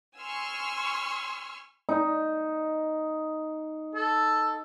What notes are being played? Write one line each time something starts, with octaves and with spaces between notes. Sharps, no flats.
G#5 C6 C#6 E6 F6
D#4
A4